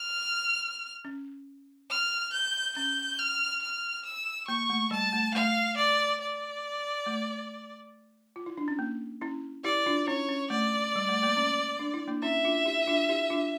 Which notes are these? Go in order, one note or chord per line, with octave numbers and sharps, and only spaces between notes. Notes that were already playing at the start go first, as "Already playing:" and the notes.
Already playing: F6
C#4
F6
G6
C#4 G6
F6
F6
E6
A#3 C#6
A3
G3 A5
A3
A3 F5
D5
D5
A3
F4
E4
D4
C#4
A#3
C#4 E4
E4 G4 D5
D4 F4
C#4 E4 C#5
C#4
A3 D5
G3
A3
A#3
C#4
D4
E4
A#3 D4
C#4 E4 E5
D4 F4
E4 G4
D4 F4
E4 G4
D4 F4